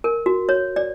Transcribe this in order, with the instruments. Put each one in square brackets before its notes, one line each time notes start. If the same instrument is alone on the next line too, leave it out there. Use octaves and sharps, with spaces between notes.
[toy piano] A#4
F#4
C#5
D5